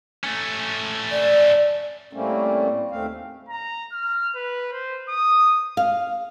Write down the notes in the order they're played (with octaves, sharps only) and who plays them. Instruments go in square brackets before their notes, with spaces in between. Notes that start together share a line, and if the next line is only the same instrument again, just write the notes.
[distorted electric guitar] A3 C#4
[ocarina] D5
[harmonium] A2 G3 A3 A#3 C4 C#4
D#2 A3 C4 F5
[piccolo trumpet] A#5
F6
B4
C5
D#6
[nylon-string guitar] F5